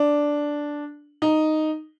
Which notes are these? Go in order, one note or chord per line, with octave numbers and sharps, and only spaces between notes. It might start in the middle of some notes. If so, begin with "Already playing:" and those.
Already playing: D4
D#4